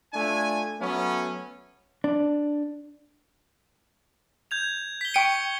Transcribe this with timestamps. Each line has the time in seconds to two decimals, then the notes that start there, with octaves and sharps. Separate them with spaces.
0.14 A3 D4 F4 G#5
0.80 F#3 A3 B3 C#4
2.04 D4
4.51 G6 G#6 F7
5.01 B6 G7
5.14 G5 C#6 C#7 D#7